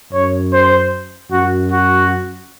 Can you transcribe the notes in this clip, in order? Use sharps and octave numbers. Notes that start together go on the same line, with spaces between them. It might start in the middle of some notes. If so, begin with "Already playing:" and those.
F#2 C#5
C5
F#2 F#4
F#4